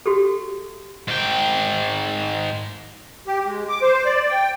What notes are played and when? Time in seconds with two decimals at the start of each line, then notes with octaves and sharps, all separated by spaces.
0.06 F#4 G4 A4
1.08 G#2 G5
3.27 G4
3.47 G#3
3.69 D6
3.82 C5
4.05 D5
4.30 G5